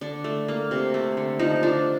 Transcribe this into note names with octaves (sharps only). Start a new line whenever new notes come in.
D3 D4
A3
A#3
C3
A3
D3
F3 D#4
F3 D4